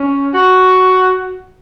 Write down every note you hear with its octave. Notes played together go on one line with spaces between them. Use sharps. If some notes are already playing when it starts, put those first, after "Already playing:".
Already playing: C#4
F#4